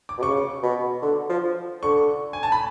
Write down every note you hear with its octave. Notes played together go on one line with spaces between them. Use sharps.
D6
B2
C#3 C#6
B2
D3
F3
D3 C#6
G#5
A5
B5